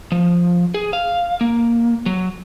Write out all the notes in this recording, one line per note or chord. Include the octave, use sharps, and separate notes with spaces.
F3
G#4
F5
A#3
F#3